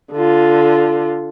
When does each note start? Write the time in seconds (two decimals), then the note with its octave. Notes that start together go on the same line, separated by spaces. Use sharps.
0.13 D3 F4